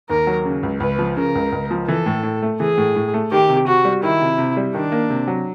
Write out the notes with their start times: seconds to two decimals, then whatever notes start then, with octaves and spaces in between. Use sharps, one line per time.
0.09 D#2 A#4
0.27 F#3
0.45 C#3
0.63 C#2
0.80 C#2 B4
0.99 F3
1.17 C#3 A#4
1.35 C#2
1.52 C#2
1.71 F3
1.87 E3 A4
2.06 A2
2.23 A2
2.42 A3
2.60 E3 G#4
2.77 A2
2.96 A2
3.14 A3
3.32 D#3 G4
3.49 C3
3.67 C3 F#4
3.85 G3
4.03 D#3 E4
4.21 C3
4.38 C3
4.57 G3
4.74 D#3 D4
4.92 A#3
5.10 C3
5.27 F#3